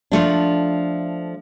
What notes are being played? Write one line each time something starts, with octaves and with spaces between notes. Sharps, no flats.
F3 A3 D4